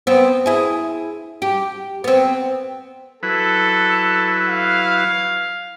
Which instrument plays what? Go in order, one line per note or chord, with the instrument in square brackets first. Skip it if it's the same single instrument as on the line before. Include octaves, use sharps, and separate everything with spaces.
[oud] B3 C4
E4 G#4
G4
B3 C4
[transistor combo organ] F#3 E4 B4 [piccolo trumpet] A4
[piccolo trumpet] F5